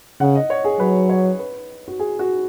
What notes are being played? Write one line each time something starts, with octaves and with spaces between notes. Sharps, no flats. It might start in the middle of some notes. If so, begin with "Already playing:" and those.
C#3 F#5
D#5
C#5
G#4
F#3 B4
C#5
B4
F#4
G#4
F#4